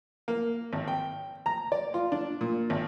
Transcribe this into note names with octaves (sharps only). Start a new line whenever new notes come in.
A#3
G#1
G5
A#5
D5
F4
D4
A#2
G#1